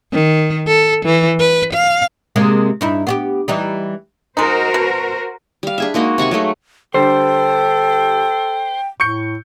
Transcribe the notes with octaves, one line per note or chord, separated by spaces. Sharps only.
D#3
A4
E3
B4
F5
C3 G#3 A#3
G2 D#4 E4
B3 F#4 G4
E3 G3 D#4
G#3 D#4 F#4 A#4 C5
B2
G3 F5
D4 G#4 E5
G#3 A#3 D#4 F#4
C3 F#5 G#5 C#6
F#3 G#3 A3 D#4
D3 G3 A4 C5 G5
A2 C#6 G6 C#7